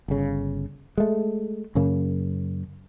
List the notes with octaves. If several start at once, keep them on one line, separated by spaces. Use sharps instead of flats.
G1 C#3
G#3 A3
F#2 C#3 A#3